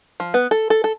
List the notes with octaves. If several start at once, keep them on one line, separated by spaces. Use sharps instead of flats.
F3
B3
A4
A4
A4